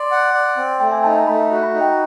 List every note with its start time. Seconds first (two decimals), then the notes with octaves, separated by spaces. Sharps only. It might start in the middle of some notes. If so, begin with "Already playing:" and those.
Already playing: D5 C6
0.11 F#5
0.34 D5
0.57 C4
0.80 A3 G5
0.92 G#5
1.04 D#4 A5
1.15 A#5
1.27 A3 B5
1.45 A#5
1.51 F#4
1.63 B5
1.74 D#4
1.81 G5